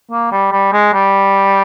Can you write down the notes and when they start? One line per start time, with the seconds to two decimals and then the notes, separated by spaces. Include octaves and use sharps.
0.11 A#3
0.32 G3
0.52 G3
0.73 G#3
0.93 G3